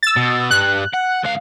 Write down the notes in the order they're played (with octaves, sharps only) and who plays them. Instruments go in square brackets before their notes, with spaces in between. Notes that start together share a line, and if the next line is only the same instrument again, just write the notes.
[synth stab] E6 A6
[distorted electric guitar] B2
[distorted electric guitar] G2 [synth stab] F#6
[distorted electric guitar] F#5
C#2 F5